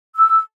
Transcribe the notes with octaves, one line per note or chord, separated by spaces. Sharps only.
E6